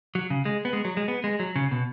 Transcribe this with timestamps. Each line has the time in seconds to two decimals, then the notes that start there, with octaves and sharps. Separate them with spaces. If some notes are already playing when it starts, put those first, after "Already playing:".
0.15 F#3
0.30 C#3
0.45 G#3
0.65 B3
0.73 G#3
0.85 F#3
0.97 G#3
1.08 B3
1.24 G#3
1.40 F#3
1.56 C#3
1.71 B2